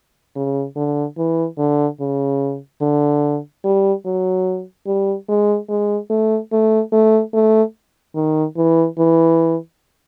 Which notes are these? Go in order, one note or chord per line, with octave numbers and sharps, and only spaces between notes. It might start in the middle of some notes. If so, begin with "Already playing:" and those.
C#3
D3
E3
D3
C#3
D3
G3
F#3
G3
G#3
G#3
A3
A3
A3
A3
D#3
E3
E3